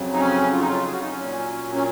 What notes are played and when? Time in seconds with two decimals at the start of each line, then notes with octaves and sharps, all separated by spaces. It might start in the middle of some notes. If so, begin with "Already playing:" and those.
Already playing: F2 C#3 F#3
0.13 D#4
0.19 C#4
0.53 F4
0.59 D#4
0.68 F4
0.85 G#4
0.93 F#4
1.02 D#4
1.09 C#4
1.17 A#2 F#3
1.75 C#4